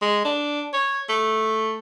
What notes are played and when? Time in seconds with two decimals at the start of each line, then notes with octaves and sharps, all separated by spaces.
0.02 G#3
0.25 D4
0.73 C#5
1.09 A3